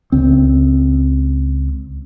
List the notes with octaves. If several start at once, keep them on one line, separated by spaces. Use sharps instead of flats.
C#2 C4